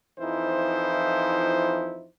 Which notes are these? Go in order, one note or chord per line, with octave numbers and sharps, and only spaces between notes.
F2 E3 F3 D#4 E4 C5